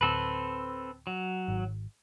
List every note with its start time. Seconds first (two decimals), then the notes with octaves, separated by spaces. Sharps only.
0.01 D1 C4 A4 B4
1.07 F#3
1.48 G#1